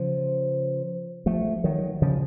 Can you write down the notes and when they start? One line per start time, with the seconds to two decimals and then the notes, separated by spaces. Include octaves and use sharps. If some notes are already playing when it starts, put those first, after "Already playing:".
Already playing: C#3 F3
1.26 F3 A3
1.64 D#3 F#3
2.02 C#3 F3